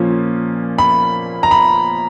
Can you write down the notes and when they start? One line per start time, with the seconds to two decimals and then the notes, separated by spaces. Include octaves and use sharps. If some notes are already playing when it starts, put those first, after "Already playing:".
Already playing: A#2 F3 A#3 C#4
0.78 B5
1.43 A#5
1.51 B5